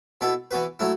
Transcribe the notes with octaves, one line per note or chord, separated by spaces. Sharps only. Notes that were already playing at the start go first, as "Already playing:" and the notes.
B2 B3 E4 A4
E3 B3 F#4 B4
F#3 A3 E4